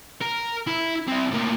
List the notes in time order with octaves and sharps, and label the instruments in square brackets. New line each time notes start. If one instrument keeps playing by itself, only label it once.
[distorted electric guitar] A#4
E4
C4 E4
A2 A#3